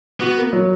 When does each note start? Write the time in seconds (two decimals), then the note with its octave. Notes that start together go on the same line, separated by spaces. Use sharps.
0.20 B3 F#4
0.37 A#3
0.53 F#3